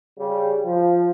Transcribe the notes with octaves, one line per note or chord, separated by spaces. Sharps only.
C#3 G3
F3